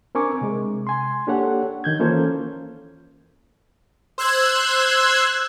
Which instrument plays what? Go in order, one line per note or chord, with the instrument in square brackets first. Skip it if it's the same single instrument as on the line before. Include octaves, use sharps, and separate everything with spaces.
[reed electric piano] C4 D4 A#4 G#5 C#6 D6
C3 G#3
G#5 C6
A#3 D4 G4 A4 C#5 F#5
D#3 G6 G#6
E3 A#3 C#4 F4 A4 C5
[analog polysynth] C5 E6 F#6 G#6